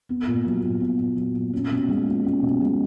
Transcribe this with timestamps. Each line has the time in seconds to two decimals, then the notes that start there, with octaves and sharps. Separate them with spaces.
0.09 B3
0.27 A#2
0.45 F#3
0.63 A#2
0.80 B3
1.00 A#2
1.16 F#3
1.35 A#2
1.53 C#4
1.71 B2
1.89 G#3
2.06 F4
2.24 C#4
2.43 B2
2.61 G#3